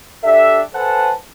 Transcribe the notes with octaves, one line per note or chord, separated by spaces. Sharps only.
D4 G4 A4 E5
A4 B4 C5 F#5 G#5 A5